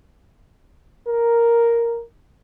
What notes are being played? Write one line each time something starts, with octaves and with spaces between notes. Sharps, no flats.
A#4